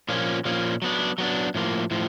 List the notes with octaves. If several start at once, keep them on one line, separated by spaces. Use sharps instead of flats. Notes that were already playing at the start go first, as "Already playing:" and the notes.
A#2 F3 A#3 C#4
A#2 F3 A#3 C#4
F#3 B3 D4
F#3 B3 D4
A2 F3 A#3
A2 F3